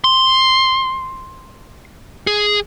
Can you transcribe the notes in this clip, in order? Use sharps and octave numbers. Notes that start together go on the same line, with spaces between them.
C6
G#4